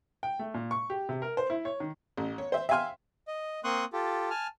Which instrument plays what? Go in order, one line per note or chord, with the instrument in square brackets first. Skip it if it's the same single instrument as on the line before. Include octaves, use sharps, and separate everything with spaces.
[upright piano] G5
A3
A#2
C#6
G4
C3
A#4
C5
E4
C#5
D#3
[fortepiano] A1
C#5
C5 E5
E5 F5 G5 G#5 C6 F6
[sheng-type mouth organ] D#5
A#3 C4 C6 C#6 D#6 F#6
F4 G4 A4
G#5 A5 F6